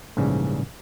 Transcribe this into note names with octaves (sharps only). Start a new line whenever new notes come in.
A#1 G#2 C#3 E3 G3